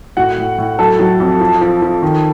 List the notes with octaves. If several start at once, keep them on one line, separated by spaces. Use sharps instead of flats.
A2 F#4 F#5
A2
A2
F#3 A4 A5
F#3
F2
F3
F3
F3
D#3